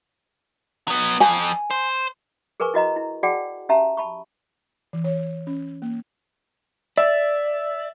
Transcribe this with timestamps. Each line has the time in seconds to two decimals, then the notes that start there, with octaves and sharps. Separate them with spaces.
0.88 F#3 B3
1.20 F2 G#5
1.71 C5
2.60 G#4 A#4 B4 G#5 C#6
2.74 E4 F#4 D#5 A#5
2.96 E4
3.23 F#4 G#4 D5 F#5 G5 A5
3.69 C#4 G4 E5 A5 A#5
3.97 A5 B5 C#6
4.93 E3
5.04 C#5
5.47 C#4
5.82 A#3
6.97 D5 E5